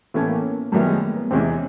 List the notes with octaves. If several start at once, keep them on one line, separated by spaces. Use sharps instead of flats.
A2 E3 A3 B3 C#4
A#3
F#2 D#3 G3 A3 B3 E4
G#3
A#3
B3
E2 C3 E3 G#3 C4 C#4